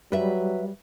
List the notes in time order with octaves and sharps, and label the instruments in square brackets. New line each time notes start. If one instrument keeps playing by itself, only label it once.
[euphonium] F#3 [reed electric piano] G3 [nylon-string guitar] B4 E5